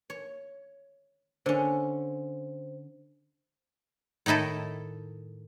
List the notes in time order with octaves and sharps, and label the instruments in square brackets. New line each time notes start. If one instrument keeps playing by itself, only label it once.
[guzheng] C#5
[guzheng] D3 C#4 [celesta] C5
[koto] A2 D#3 D#4 E4 A4